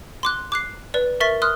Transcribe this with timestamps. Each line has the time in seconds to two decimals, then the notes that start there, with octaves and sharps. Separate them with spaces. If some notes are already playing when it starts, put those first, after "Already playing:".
0.23 C6 D6 F#6
0.52 D6 F#6 C7
0.94 B4 D5
1.20 A#4 E5 C#6 A6 B6
1.42 C6 D#6 F6 F#6